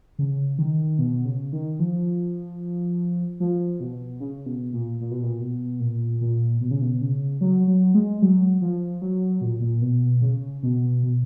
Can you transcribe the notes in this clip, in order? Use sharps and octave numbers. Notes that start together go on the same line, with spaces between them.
C#3
D#3
B2
C#3
D#3
F3
F3
B2
C#3
B2
A#2
A#2
B2
A#2
B2
A#2
A#2
B2
C#3
B2
C#3
F#3
F#3
G#3
F#3
F3
F#3
A#2
A#2
B2
C#3
B2
B2